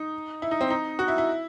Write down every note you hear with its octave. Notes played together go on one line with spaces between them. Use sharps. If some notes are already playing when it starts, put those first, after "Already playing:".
Already playing: D#4
E4
D#4
C4
D#4
F#4
E4
E4